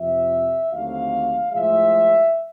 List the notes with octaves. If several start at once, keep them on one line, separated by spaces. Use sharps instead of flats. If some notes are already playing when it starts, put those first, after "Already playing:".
Already playing: F2 C3 F3 E5
D#2 D3 F#3 A3 C4 F5
A2 F3 G#3 E5